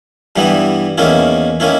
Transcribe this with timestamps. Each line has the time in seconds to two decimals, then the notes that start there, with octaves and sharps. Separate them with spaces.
0.36 G2 E3 G3 B3 E4
0.98 E2 D#3 A#3 C#4 E4
1.60 D#3 A#3 C#4 E4